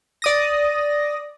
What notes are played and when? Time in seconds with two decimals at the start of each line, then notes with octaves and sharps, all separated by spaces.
0.22 D5 D#6 A#6